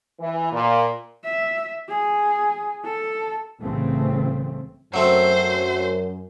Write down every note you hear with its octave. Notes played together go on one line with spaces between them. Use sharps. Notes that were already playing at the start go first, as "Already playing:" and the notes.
E3
A#2
E5
G#4
A4
C2 A2 C#3 E3 A3 C4
F#2 F#3 A3 C4 C5